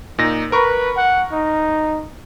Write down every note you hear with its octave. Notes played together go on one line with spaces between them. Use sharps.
A#2 D#4 A#6
A#4 B4 C#6
F#5
D#4